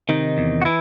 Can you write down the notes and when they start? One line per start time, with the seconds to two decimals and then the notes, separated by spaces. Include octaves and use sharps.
0.09 C3 D#3 D#4
0.38 E2
0.62 F#4
0.65 E3 E4